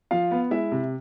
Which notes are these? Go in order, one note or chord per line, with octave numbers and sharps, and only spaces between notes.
F3 F4 F5
B3
G#3 E4 E5
C3